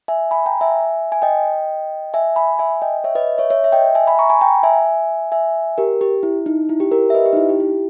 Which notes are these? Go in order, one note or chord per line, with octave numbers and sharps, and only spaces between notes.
E5 G#5
G#5 B5
G5 A#5
E5 G#5
G#5
D#5 G5
E5 G#5
G#5 B5
E5 G#5
D#5 G5
C#5 E5
B4 D#5
C#5 E5
C#5 E5
E5
D#5 G5
E5 G#5
G#5 B5
A#5 C#6
G#5 B5
G5 A#5
E5 G#5
E5 G#5
G4 A#4
G4
E4
D#4
E4
G4
G4 A#4
E5
B4 D#5
G4
D#4
E4
G4
E4